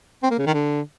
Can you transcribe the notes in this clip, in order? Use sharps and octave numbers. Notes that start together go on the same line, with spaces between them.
C4
A#3
C#3
D#3
D3